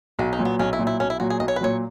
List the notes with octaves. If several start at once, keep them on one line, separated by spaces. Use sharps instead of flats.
B1 F#4
D#4
A#2 F#3
B3
B1 C#4
E4
A#2 F#3
E4
B1 C#4
E4
A#2 F#3 F#4
G#4
B1 D#5
C#5
B4
A#2 F#3 C#5